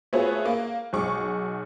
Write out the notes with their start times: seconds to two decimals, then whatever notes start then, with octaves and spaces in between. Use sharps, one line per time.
0.13 A3 B3 F4 F#4 G#4 C#5
0.45 A#3
0.93 B1 G#4 C#6 D6